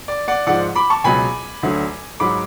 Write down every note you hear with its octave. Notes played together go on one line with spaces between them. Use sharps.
D5
D5 F#5
G#2 F3 D5 F#5
B5 D6
A5 C#6
C#2 B2 F#3 G#5 B5
D2 D3 F#3
G#2 F#3 B5 D6